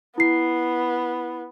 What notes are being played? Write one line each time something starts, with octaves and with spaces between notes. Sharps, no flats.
B3 E4 C7